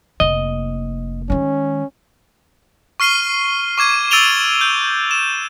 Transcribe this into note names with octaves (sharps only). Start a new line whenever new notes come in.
F1 A#3 D#5
D#3 G#3 C#4
C#6 F6 C7 D#7 G7
C#6 D6 G#6 D#7
E6 A6 D7 D#7 F7 G7
G6
E7